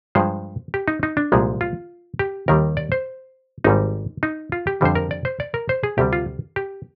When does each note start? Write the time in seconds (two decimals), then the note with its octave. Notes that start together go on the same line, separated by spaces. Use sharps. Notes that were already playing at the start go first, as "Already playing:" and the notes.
0.15 G2 F3 G#3 C5
0.74 G4
0.88 D#4
1.03 D#4
1.17 D4
1.32 C2 A#2 F3 G#3
1.61 F4
2.19 G4
2.48 D#2 D#3 G3 A#4
2.77 D5
2.92 C5
3.64 G#1 G#2 G3 D#4
4.23 D#4
4.52 F4
4.67 G4
4.81 F2 D3 G3 C5
4.95 A#4
5.11 D5
5.25 C5
5.40 D5
5.54 A#4
5.69 C5
5.83 G#4
5.98 D2 C3 G3 G4
6.13 F4
6.56 G4